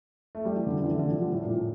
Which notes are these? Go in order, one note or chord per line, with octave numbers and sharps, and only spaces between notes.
A3
G3
E3
D3
E3
D3
E3
D3
F3
G3
A2
A#2
A2